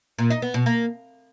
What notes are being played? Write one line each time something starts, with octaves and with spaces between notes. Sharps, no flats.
A#2
D#4
B3
B2
A#3